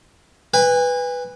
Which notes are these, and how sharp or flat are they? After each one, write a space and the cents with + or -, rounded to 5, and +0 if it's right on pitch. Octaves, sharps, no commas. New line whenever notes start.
B4 +0 G#5 -35